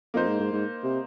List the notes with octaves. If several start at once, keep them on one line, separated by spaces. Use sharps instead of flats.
F2 A#3 D#4 C5
G#2
G#2
G#2
C3